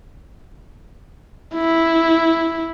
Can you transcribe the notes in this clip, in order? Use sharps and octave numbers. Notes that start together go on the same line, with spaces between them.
E4